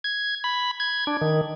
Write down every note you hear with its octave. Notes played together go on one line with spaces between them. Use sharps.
G#6
B5
G#6
D4
D#3